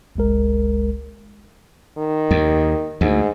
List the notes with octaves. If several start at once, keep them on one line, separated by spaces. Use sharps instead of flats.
G1 C#2 G#3 A#4
D#3
D#2
D2 G#2